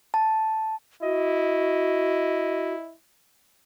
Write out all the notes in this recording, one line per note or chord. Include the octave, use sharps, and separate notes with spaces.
A5
E4 F#4 D#5